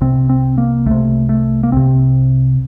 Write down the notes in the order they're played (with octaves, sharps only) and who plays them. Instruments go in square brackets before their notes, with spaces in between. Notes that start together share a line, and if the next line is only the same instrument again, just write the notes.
[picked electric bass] C2 C3 C4
C4
A#3
C2 C3 A3
A3
A#3
C2 C3 C4